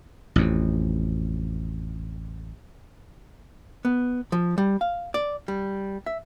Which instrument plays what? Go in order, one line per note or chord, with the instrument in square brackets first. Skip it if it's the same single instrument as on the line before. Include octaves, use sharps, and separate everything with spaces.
[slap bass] A1 F2
[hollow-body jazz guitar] B3
F3
G3
F5
D5
G3
E5